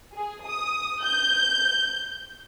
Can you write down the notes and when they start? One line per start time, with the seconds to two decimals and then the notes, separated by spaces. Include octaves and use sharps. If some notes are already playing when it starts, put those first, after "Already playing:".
0.14 G#4
0.46 D#6
1.02 G6